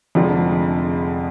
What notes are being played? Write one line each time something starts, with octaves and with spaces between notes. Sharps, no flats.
F1 F2 D3 F3 G#3